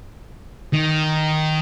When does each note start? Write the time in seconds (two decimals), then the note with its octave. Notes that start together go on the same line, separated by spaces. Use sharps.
0.73 D#3